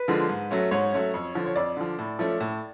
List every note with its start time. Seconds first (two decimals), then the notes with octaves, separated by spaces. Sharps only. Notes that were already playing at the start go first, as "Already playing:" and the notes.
Already playing: B4
0.08 D3 F3 G#3
0.29 G#2
0.51 F#3 A3 C#4
0.71 G#2 C#5
0.93 F#3 A3 C#4
1.14 F2
1.35 D3 F3
1.46 C#5
1.56 F2 D5
1.77 D3 F3
1.99 A2
2.19 F3 A3 C#4
2.40 A2